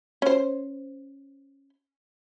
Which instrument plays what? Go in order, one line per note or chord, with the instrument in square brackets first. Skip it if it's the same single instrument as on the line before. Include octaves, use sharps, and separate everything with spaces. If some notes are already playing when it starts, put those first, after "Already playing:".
[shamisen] C#4 C5